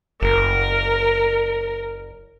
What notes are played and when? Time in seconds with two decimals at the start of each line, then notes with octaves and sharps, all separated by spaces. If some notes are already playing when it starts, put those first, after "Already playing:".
0.22 F#1 A#4